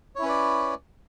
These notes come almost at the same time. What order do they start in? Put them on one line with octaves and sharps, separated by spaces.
C#5 E4 C#4 B4 D5